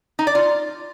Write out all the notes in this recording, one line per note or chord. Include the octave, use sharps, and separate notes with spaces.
D#4
D5
F4